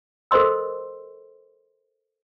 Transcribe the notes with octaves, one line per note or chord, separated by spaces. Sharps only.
A4 A#4 C5 D#5 C6 E6